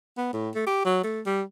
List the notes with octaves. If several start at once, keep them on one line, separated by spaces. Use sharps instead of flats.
B3
A2
A3
G4
F#3
A3
G3